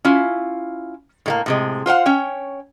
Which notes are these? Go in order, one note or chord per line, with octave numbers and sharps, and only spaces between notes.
C#4 E4 F4
A2 G#3 A#3
A2 C3 G#3
F4 C5 F5 F#5
C#4 C#5 G5